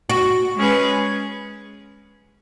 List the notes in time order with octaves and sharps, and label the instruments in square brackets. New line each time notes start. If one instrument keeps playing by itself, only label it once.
[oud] F#4
[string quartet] G#3 C#4 G#4 B4